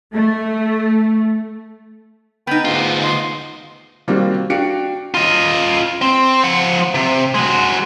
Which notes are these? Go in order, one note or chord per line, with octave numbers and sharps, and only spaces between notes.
A3
B3 D#4 G5 B5
D2 G#2 F4
D#5 C6
D#3 G3 A#3 C4 F4 F#4
D4 F#4 F5 G5 C#7 D7
F4 D#5
C4
F3 F#5
C3
G#3 F#4